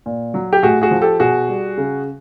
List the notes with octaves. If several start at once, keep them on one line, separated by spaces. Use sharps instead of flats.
A#2
F#3
G4
A2 F#4 G#4
F#4 G#4
F3
G4 A4
B2 F#4 G#4
G3
C#3